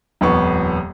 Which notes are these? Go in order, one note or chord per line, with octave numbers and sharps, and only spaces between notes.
D#1 F2 B3 C#6